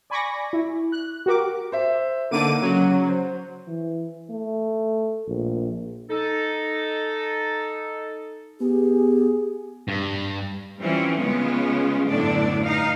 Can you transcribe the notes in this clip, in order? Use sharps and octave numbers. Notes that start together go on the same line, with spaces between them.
D5 G#5 B5 C#6 D6 A#6
E4
F#6
F#4 G4 A#4 D6
C5 E5
D3 A#3 D#4 D6 D#7
C#3 F#3
C5
E3
A3
A#1
D#4 A4
B3 G4 G#4
G2
E3 G3 C4 C#4 F4
C#3 G#3 B3 C#4 F4
F#2 A2 D3 B3 D4 D5
G2 D#4 F5